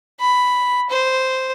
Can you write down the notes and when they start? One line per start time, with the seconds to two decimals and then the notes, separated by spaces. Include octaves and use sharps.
0.20 B5
0.90 C5